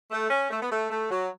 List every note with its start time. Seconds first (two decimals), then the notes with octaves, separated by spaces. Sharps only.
0.11 A3
0.30 C#4
0.51 A3
0.62 B3
0.71 A3
0.90 A3
1.10 F#3